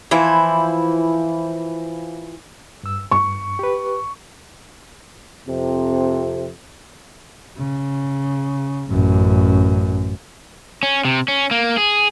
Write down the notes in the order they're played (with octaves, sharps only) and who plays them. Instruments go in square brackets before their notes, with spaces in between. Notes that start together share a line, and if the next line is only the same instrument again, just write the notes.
[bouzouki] E3 F3 E4 C5
[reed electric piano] G2 E6
[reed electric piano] G2 [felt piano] C#6
[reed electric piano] G4 B4
[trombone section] F2 C3
[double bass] C#3
A1 F#2
[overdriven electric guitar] C#4
C3
C#4
A#3
G#4